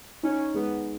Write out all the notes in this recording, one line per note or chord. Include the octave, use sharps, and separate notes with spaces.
C#4 D#4
G#3 B3